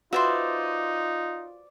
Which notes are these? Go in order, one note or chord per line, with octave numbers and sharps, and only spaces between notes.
D#4 F4 F#4 B4 C5 D5 E5